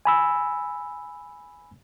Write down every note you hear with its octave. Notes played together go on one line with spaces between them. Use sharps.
G#5 B5 E6